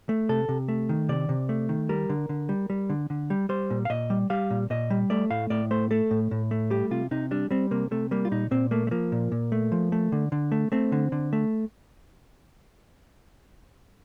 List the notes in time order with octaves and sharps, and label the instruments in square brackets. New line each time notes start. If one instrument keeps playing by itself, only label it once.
[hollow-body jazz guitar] A3
C3 A4
C3
A3
D#3
C3 D5
C3
A3
D#3
G3 A#4
D3
D3
G3
G3
D3
D3
G3
G3 C5
A#2
F5
A#2 D#5
G3
G3 F5
A#2
A#2 D#5
G3
A3 D5
A2 F5
A2 D5
A3 C5
A3 A4
A2
A2
A3
G3 G4
C3 F4
C3 D#4
G3 D4
G3 C4
C3 A#3
C3 A3
G3 A#3
F4
A#2 D#4
A#2 C4
A3 A#3
A3
F3 A#3
A#2
A#2
A3
F3
A3
D3
D3
A3
A3 C4
D3
D3
A3